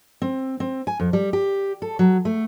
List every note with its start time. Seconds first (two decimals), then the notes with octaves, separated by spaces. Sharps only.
0.22 C4
0.60 C4
0.87 G#5
1.00 F2
1.13 G3
1.33 G4
1.82 A4
1.99 F#3
2.25 A3